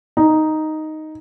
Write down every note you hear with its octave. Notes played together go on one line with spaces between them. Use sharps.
D#4